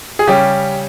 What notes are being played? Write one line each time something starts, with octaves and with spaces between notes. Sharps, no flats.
G#4
C#3 G3 C#4 G4